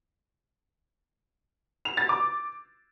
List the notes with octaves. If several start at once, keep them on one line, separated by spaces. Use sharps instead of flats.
F7
A6
D6